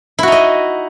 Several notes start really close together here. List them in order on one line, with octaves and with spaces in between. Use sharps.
E4 F#4 D#4 D#5